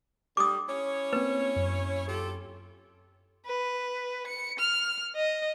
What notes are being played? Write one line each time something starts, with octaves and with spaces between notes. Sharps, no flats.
D3 G3 D6 D#6
C#4 E4 C#5
A#3 C4 B4
F#2
F4 G4 A4
B4
C#7
F6
D#5